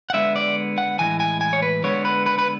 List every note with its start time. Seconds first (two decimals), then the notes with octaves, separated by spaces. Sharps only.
0.10 F#5
0.14 D3 G#3 B3 E5
0.36 D5
0.78 F#5
0.99 A2 E3 G#3 G#5
1.20 G#5
1.41 G#5
1.53 C#5
1.62 B4
1.84 D3 G#3 B3 C#5
2.05 B4
2.26 B4
2.39 B4